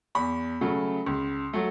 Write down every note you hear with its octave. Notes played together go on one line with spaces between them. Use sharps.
E2 B5
C#3 F#3 A3
C#2
F#3 A3